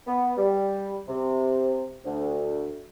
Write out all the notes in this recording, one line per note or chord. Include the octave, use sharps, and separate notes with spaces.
B3
G3
C3
D2